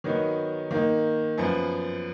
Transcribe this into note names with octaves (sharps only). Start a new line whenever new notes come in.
D#3 F#3 B3 D#4
D#3 A#3 D#4
F#2 F3 B3